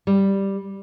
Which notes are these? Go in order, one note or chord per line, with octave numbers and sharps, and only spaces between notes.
G3